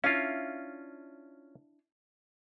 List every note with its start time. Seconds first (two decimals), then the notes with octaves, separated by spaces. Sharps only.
0.04 C#4 D4 E4 F4 F5